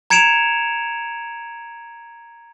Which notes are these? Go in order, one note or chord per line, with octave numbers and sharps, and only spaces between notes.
A#5 G#6 C#7 D7 E7 F7